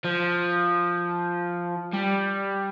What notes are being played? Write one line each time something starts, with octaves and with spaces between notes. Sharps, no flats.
F3
G3